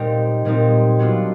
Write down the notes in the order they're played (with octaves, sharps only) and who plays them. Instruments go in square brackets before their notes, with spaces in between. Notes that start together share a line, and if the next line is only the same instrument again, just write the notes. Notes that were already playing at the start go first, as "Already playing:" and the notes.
Already playing: [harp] A#2 G3 C4 D#4
A#2 G3 C4 D#4
F#3 B3 D4 F4